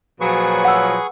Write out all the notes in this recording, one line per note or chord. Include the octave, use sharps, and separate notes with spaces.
A#2 F3 F#3 G#4 B4 C#6
F#5 E6